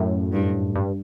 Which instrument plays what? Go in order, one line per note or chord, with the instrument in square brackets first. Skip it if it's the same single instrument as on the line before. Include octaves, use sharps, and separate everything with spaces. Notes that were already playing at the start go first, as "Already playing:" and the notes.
Already playing: [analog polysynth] F#2 A2
[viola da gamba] G2
[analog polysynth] G2